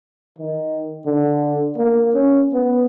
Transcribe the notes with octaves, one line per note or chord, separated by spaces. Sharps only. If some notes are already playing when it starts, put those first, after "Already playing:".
D#3
D3
A#3
C#4
B3